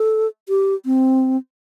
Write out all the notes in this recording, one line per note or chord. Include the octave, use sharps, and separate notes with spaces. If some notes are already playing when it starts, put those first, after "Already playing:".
Already playing: A4
G4
C4